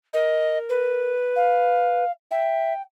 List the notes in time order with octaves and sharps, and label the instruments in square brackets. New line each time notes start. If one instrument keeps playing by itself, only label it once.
[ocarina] A#4 [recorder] D#5
[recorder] B4
[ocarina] F5
[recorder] E5 [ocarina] G5